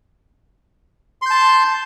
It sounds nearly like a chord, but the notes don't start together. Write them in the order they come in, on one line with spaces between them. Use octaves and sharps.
C6 G6 A5